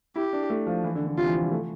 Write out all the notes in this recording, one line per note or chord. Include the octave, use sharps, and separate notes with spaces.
E4 G4
D4
A3
F3
E3
D3
D3
C3 F4
E3
F3
G3
A3